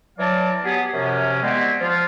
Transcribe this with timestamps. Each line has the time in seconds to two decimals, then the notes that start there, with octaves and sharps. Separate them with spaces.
0.19 E3 F#3 D5 F5 A5 D6
0.65 F#3 B3 G4 G#4
0.94 F#2 C3 F3 C#4
1.43 G3 G#3 B3 C4 E4 F#4
1.80 F3 F4